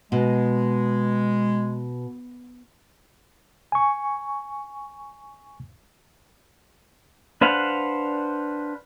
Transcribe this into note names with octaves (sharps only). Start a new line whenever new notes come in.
B2 G#3
G#5 C#6
D4 B4 C5 F5 F#5